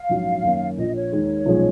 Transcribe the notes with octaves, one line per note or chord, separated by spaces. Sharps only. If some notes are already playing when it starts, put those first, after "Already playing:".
Already playing: F5
A#1 G#2 F#3 C#4 F#4
F#2 D#3 A#3 C#4
A#1 A#2 F3 D#5
C#5
D#2 D#3 G#3
B1 A#2 F3 G#3 C#4